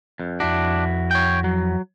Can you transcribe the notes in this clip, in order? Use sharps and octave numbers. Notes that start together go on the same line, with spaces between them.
F2
F2 D4 E4 F#4
C#5 G5
F#3